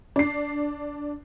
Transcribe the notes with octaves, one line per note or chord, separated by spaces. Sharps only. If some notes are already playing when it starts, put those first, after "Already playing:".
D4 C7